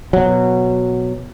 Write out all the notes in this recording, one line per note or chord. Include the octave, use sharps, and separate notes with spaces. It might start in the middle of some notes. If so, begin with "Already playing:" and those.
B2 F#3